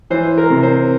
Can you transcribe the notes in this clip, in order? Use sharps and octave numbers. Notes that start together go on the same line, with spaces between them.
E3 C5
A#4
C3
C5